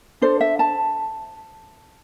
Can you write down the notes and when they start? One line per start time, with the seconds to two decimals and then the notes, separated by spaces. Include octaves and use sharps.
0.22 D4 A4 C5
0.41 E5
0.59 A5